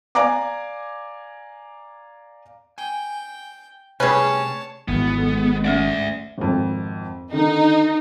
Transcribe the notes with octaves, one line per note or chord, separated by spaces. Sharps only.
D5 F5 G#5 A#5 D6
G5 G#5
C3 G3 A3 C#4 G#4 B4 C#5 A5
G#1 E3 B3
G#2 G#3 A4
A3 C#4 D5 E5 F#5
G#1 F2
D3 D#3 D#4